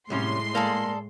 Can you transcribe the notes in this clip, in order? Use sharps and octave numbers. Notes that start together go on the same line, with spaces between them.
C2 A2 G3 G#3 C#4 C6
A#3 G#4 A4 D5